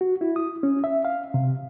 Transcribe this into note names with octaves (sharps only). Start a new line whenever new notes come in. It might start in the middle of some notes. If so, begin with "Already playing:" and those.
F#4
E4
D#6
C#4
E5
F5
C3